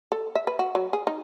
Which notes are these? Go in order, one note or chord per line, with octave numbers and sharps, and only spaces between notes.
A4
E5
B4
F#4
F#3
G#4
D#4